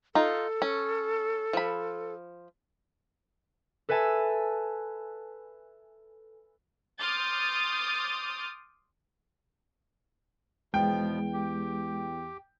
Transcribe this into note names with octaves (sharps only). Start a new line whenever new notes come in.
D#4 F4 A4
C#4
F3 B5
A4 B4 E5 G#5 A5
C6 D6 D#6 F6 G6 A6
E2 B2 F3 G#3 G5
G4